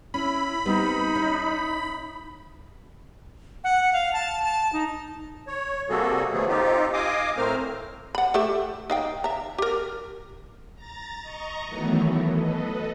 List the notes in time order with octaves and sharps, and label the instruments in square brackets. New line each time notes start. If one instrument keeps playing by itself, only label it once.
[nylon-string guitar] C#4 [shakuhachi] E4 [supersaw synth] B5
[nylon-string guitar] G3 B3 C4 [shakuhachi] D#4
[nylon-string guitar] C#4 E4
[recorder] F#5
F5
A5
A5
D#4
[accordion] C#5
C3 G3 A#3 F#4 G#4 A4
D3 F3 F#3 A3 B3 G#4
C4 D#4 F4 G4
D#5 F5 G#5 D6 D#6
A2 A3 C4 A#4 C5 F6
[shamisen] F#5 B5
A3 G4 E5
D#4 F5 G5
E5 A#5
G4 A#4
[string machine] A#5 A6
D#5 A#5 C#6
D#3 E3 F#3 A3 B3
A4 B4 D#5